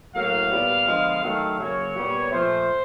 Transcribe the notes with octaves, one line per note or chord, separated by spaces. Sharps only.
A2 F#3 A#3 F5
A#2 G3 B3
D3 F3 G#3 B3
D#3 F#3 A3 F5
C#3 F#3 A#3 C#5
A#2 G3 B3
A#2 F3 A3 C5